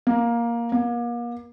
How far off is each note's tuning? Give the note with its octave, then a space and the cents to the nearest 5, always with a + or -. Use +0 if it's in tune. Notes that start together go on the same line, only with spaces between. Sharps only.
A#3 +10
A#3 +35